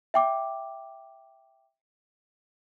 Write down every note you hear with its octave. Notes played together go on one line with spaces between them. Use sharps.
E5 G5 D6